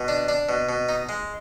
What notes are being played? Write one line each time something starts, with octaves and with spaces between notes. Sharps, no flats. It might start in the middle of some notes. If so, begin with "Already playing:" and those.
Already playing: B2
D4
D4
B2
B2
D#4
G#3